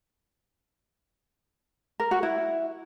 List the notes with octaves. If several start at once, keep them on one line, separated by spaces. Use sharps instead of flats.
A#4
F#4
E4